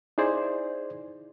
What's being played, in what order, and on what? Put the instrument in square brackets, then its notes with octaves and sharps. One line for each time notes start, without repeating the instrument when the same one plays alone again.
[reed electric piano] D#4 E4 G#4 C5 D5